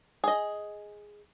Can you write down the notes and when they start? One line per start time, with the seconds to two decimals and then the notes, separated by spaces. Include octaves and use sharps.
0.24 G#4 D#5